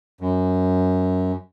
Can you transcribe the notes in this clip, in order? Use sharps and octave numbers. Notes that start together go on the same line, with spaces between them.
F#2